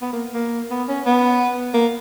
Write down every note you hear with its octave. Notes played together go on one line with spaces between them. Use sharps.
B3
A#3
A#3
B3
C#4
B3
A#3